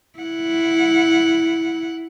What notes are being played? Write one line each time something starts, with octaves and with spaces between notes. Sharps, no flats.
E4 F#5